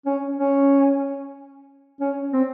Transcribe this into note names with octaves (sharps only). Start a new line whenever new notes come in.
C#4
C#4
C#4
C4